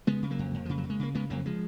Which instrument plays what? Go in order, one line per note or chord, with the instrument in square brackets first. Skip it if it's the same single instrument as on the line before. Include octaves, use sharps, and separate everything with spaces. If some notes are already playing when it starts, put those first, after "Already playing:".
[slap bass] C#3 G#3 B3
C#3
F#3 A#3
F2
F2
C#3 F3
F#3
C#3
G#3
C#3 A#3
C#3 G#3 B3
F2 F#3 A#3
F3 G#3